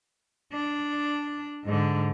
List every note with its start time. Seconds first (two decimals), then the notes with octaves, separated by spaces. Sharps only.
0.52 D4
1.65 G#2 D3